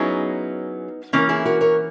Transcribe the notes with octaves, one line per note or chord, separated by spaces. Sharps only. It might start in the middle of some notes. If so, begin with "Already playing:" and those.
Already playing: F#3 B3 C#4 D#4 E4 G#4
E3 A#3 C#4 A#4
E4 G#4
F#4 A#4
A#4 C#5